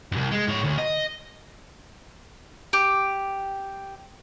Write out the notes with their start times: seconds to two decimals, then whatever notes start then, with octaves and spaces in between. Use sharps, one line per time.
0.12 C2 F#2
0.32 G#3
0.48 G#2 C#5
0.65 D2
0.78 D#5
2.73 G4